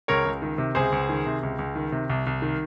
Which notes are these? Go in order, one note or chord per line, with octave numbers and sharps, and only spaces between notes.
C#2 A#4 C#5
C#2
D#3
C3
C#2 G#4 C5
C#2
D#3
C3
C#2
C#2
D#3
C3
C2
C2
D#3